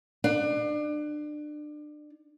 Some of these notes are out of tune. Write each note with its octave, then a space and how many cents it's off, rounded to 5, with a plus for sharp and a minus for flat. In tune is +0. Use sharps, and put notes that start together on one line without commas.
D4 +30